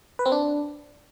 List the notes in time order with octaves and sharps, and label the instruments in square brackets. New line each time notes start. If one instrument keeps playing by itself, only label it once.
[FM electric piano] B4
C4
D4